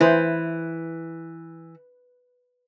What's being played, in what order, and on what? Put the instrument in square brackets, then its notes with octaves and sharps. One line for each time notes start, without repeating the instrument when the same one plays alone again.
[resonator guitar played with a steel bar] E3 [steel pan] E4 B4 C5